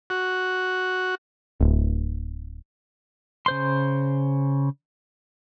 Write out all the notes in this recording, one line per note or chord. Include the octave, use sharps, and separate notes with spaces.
F#4
D1
C#3 C5 C6